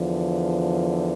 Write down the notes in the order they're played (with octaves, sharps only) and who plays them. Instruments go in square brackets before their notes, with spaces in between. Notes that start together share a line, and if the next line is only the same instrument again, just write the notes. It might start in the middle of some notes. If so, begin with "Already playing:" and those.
Already playing: [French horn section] E2 D3 F3